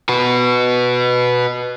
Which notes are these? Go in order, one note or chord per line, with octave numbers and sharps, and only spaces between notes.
F#4 B4